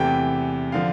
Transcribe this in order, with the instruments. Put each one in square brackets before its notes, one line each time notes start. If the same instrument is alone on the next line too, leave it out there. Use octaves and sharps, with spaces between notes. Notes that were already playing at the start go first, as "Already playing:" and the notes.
Already playing: [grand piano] E2 C3 E3 A3 G5
D3 F3 F5